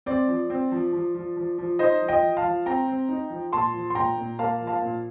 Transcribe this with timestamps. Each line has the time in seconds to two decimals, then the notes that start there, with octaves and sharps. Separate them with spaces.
0.06 C4 D5
0.28 F3
0.50 C4
0.72 F3
0.93 F3
1.15 F3
1.37 F3
1.58 F3
1.79 D#4 C5 D#5
2.02 F3
2.08 D#5 G5
2.23 F3
2.37 F5 A5
2.44 F3
2.66 C4 G5 A#5
2.88 C4
3.09 D#4
3.30 F3
3.52 A#2 A5 C6
3.74 F3
3.90 C6
3.95 A#2 G5 A#5
4.17 A#2
4.39 A#3 F5 A5
4.61 F3
4.67 F5 A5
4.82 A#2